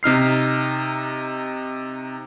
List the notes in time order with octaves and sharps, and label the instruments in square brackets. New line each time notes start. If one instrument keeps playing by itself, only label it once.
[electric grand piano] C3 D#4 F6 C7